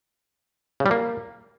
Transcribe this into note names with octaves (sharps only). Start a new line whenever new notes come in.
C#3
G3
A#3